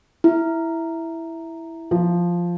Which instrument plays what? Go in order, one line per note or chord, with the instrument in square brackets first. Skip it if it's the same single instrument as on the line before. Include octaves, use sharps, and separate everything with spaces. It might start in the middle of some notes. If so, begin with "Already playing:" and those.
[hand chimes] E4
[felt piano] F3